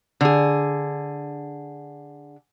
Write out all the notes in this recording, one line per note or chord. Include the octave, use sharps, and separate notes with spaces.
D3 G#4